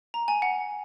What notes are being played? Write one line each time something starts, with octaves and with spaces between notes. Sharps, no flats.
A#5
G#5
F#5